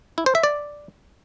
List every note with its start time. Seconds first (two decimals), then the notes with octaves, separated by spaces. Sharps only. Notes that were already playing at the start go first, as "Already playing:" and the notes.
0.18 E4
0.26 C5
0.35 E5
0.43 D5